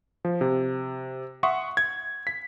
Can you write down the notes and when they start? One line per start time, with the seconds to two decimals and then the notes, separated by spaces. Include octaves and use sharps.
0.25 F3
0.41 C3
1.43 E5 F#5 C6 C#6 D#6
1.77 G#6
2.27 B6